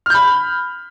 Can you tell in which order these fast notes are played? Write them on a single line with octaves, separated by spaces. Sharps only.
F6 G6 B5